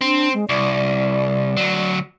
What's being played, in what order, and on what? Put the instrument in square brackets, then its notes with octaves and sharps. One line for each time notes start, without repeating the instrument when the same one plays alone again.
[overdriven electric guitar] C4 [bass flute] D4
[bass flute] G#3
[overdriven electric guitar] C2 [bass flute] D5
[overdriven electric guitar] D2 F#3